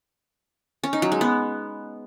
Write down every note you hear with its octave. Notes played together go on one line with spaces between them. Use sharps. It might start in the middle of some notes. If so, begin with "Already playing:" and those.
C#4
D#4
F#3
G#3
B3